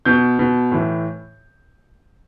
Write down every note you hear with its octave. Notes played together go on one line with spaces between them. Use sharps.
B2 G6
B2
A2 E3